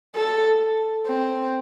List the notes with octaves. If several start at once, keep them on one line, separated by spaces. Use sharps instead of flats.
A4
C4